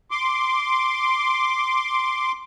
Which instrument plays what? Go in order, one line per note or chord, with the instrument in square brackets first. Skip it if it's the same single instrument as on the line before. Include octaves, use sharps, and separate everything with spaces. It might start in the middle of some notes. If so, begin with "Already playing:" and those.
[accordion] C6 D6